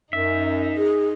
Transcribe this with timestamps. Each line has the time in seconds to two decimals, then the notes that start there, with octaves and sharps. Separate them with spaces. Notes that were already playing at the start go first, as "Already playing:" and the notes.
0.13 F#2 D#4 E5
0.77 G#4